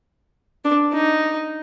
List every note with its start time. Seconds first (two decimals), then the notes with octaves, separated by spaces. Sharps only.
0.65 D4
0.94 D#4